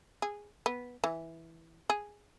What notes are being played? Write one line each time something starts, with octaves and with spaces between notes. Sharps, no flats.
G#4
B3
E3
G#4